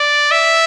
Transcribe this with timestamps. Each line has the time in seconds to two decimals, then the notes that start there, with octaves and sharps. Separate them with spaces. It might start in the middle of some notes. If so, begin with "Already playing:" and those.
Already playing: D5
0.31 E5